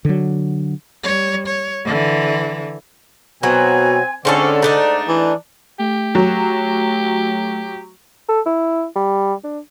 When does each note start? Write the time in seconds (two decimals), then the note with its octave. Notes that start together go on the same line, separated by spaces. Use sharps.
0.05 D3 F#3
1.04 G3 C#5
1.47 C#5
1.85 D3 E3
3.43 B2 F#3 C4 C5 G#5
4.25 G#2 D3 C4 C#4 A4 D5
4.62 A3 D4 D#4
5.08 E3
5.79 A3 G4
6.15 F#3
8.29 A4
8.46 E4
8.96 G3
9.44 D4